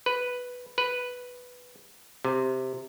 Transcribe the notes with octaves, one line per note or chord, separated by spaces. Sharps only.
B4
B4
C3